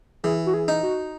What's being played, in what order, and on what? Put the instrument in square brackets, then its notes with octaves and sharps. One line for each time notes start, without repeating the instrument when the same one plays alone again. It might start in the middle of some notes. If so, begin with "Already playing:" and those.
[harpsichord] E3 [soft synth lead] G#4
[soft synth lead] F#4
G#4
[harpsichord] D#4
[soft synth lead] F#4